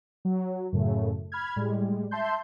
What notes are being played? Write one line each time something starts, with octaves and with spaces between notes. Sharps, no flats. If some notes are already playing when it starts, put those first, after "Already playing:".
F#3
F#2 A2 C#3 A3
B5 F6 G#6
A2 G3 G#3
E5 A5 C6 G6